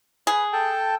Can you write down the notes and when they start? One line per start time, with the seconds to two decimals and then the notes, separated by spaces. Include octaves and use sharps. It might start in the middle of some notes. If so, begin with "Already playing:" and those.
0.27 G#4 B4
0.53 A4 G5 A5